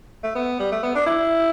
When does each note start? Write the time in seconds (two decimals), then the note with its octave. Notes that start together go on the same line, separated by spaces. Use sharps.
0.24 A3
0.35 B3
0.60 G3
0.72 A3
0.83 B3
0.95 D4
1.06 E4